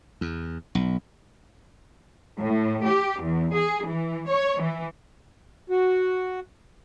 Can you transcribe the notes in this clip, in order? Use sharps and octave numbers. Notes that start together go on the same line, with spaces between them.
E2
B1
A2
G4
E2
G#4
E3
C#5
E3
F#4